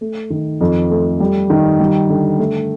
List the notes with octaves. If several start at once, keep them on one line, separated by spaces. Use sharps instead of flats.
A3
D#3
F2
A3
G3
D#3
G3
D3
A3